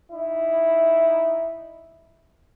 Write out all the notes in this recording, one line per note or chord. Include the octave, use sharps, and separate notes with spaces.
D#4 E4